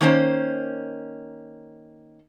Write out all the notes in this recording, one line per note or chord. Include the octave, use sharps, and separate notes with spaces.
D#3 A#3 C#4 C5